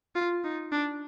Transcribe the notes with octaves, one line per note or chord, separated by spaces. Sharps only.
F4
D#4
D4